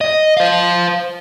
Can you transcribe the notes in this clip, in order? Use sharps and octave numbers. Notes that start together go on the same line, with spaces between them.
D#5
C5 F5